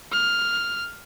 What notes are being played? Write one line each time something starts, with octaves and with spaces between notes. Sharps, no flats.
F6